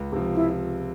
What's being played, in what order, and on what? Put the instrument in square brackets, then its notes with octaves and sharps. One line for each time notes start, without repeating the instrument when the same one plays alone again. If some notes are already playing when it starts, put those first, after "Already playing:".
Already playing: [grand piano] C#2
C3 F3
[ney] E4